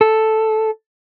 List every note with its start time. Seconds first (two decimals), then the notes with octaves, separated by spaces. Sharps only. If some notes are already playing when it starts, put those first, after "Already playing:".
0.01 A4